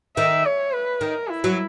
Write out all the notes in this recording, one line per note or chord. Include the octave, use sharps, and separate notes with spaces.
D#3 E5
C#5
B4
D#3 A#4
E4
F#3